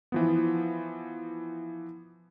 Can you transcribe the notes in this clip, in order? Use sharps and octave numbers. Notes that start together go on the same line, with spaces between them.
E3 F3 B3